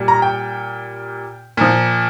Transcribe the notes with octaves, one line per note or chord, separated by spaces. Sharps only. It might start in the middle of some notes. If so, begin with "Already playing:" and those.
Already playing: A#2 G3
A#5
G5
A#2 F3